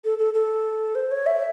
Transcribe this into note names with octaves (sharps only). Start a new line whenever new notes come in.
A4
A4
A4
C5
C#5
E5